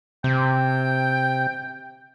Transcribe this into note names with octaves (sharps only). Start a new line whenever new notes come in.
C3 G5